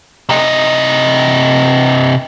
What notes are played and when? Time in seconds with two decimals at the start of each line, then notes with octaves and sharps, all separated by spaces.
0.29 C3 D#5